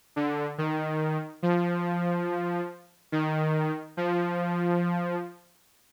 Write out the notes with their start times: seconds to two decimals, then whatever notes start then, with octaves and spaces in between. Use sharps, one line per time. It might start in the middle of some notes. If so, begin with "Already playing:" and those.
0.16 D3
0.58 D#3
1.43 F3
3.12 D#3
3.97 F3